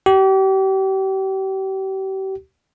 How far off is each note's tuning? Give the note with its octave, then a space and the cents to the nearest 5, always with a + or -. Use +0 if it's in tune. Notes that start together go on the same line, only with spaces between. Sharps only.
G4 -35